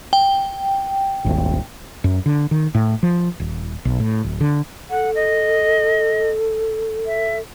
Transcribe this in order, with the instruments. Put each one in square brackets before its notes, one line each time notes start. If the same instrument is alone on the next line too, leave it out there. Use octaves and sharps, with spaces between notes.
[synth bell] G5
[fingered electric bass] D#1 G#1
[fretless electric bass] F#2
D3
D#3
A2
F3
D#1
B1
A2
D1
D3
[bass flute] A4 [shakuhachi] F#5
[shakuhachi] D#5
E5